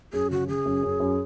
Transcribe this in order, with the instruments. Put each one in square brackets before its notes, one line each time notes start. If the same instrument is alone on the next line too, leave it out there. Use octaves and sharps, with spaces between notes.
[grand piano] F#2 [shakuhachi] G#4
[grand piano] C#3 [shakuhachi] F#4
[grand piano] C#3 [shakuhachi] G#4
[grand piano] F#2
F#2
F#2